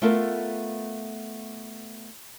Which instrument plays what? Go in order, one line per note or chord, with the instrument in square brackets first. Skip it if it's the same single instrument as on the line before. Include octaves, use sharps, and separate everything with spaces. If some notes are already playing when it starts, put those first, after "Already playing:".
[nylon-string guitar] A3 B3 F4 A4 A#4